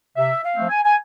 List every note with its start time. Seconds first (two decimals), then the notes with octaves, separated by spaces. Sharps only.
0.17 C3 E5
0.43 F5
0.56 F3 A3 C4
0.70 G#5
0.84 G#5